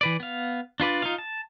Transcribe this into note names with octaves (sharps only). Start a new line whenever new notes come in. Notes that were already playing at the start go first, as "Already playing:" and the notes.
E3 B4 D5
B3 F5
D4 F4 B4 D5
D#4 F4 F5
A5